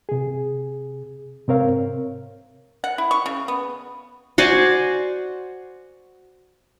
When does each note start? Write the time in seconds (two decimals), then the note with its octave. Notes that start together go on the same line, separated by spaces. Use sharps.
0.09 C3 G#4
1.48 G#2 C3 C4 A#4 C#5 F5
2.84 F#5
2.98 E4
3.11 C#6
3.26 C#3
3.48 B3
4.38 F#4 C5 D5 G#5